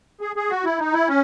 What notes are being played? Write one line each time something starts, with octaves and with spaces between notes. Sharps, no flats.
G#4
G#4
F#4
E4
D#4
E4
C#4